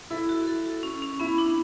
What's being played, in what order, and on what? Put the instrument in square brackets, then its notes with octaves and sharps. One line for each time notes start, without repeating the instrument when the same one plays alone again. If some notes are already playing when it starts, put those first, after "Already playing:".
[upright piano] E4 [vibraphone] A4
[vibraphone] F#4
A4
F#4
C#4
C#4
[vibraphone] B3 [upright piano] E4
[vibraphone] D4